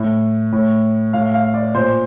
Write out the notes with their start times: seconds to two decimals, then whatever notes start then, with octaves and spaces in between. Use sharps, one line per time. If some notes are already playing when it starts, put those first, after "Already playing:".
Already playing: A2
0.52 A2
1.13 A2 F5
1.34 F5
1.54 D5
1.74 A#2 C5